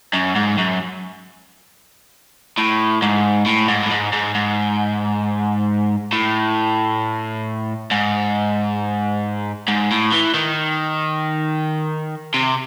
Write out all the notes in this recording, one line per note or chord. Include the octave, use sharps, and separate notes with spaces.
F#2
G#2
F#2
A2
G#2
A2
G#2
A2
G#2
G#2
G#2
A2
G#2
G#2
A2
E3
D#3
C3